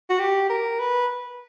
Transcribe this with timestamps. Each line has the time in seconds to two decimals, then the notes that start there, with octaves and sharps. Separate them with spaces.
0.10 F#4
0.19 G4
0.50 A#4
0.80 B4